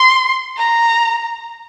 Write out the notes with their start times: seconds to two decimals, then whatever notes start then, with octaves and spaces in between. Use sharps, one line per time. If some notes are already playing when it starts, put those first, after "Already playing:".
Already playing: C6
0.57 A#5